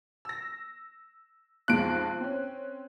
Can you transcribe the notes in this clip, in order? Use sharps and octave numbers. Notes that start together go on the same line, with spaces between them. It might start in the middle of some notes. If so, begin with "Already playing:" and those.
E6 A#6
B1 F2 G#3 F#6 D7
C4 C#4